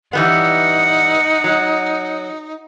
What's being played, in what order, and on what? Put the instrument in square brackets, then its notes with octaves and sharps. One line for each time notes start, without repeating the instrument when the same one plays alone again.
[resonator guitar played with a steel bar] E3 G3 B3 [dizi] D#4 [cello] F#5
[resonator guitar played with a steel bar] F#3